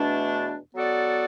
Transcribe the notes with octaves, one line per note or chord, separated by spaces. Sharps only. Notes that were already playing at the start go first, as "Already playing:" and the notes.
Already playing: E2 B2 A3 D4
F#3 B3 F#4 A4 D5